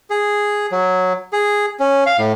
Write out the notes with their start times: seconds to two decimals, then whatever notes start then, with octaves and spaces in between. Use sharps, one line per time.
0.10 G#4
0.72 F#3
1.33 G#4
1.80 C#4
2.06 F5
2.18 A2